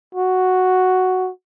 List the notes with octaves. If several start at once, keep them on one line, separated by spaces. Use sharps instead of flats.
F#4